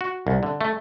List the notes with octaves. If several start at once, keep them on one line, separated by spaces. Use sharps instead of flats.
F#4
C2
D3
A3